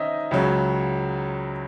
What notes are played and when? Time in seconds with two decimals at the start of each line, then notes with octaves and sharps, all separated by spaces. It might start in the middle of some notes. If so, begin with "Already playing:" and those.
Already playing: D#3 C4 C#4 D#4 D#5 E5
0.31 C#2 C#3 F#3